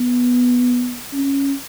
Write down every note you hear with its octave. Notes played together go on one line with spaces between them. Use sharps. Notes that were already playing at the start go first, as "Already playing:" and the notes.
Already playing: B3
C#4